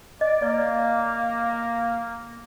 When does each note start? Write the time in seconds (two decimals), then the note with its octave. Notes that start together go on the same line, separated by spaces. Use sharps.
0.21 D5 D#5
0.42 A#3 D5